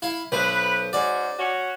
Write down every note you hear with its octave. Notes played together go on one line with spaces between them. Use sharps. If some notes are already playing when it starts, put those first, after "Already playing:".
E4 F5
B1 B4 C5
G#2 C#4 F#4 D5
C#4 F#4